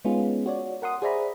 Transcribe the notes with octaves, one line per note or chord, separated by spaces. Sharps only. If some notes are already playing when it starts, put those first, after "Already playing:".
G#3 B3 C#4 D#4 F4 G#4
F#4 C#5 D5
A#4 F#5 C6 D#6
G#4 C5 D5 E5 A#5 B5